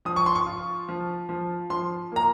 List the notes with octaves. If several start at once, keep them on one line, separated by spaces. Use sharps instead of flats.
F3 D#6
C#6
C6
C#6
F4
F3
F3
F3 C6
A#3 A#5